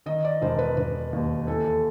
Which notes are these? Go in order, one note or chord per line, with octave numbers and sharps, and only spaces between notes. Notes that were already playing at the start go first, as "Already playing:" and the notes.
D#3 D#5
D5
E1 C5
B4
E1 B4
D#2
E3 A4
A4